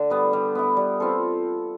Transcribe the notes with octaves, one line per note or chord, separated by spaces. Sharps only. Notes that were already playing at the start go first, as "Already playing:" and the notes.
Already playing: D3
G3 B3
G3
B3 E4
G3
C4 F4 A4